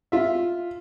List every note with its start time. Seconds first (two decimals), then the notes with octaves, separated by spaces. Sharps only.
0.12 F4 E5